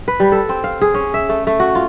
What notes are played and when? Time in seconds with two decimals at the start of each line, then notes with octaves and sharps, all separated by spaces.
0.08 B4
0.20 G3
0.32 A4
0.49 C4
0.64 F5
0.81 G#4
0.94 C#4
1.14 E5
1.29 A3
1.47 A3
1.60 F#4
1.75 F4